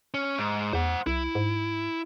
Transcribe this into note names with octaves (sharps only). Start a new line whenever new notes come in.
C#4
G#2
E2 C5 F#5
C2 E4
G#2